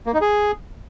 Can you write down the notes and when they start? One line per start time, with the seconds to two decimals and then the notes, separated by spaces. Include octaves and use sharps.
0.06 A#3
0.14 D#4
0.21 G#4